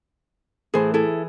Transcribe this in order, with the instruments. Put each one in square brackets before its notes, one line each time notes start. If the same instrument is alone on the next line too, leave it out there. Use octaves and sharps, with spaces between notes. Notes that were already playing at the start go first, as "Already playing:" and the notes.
[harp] A2 E3 [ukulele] G#4 C5
[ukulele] E4 A4 [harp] G#4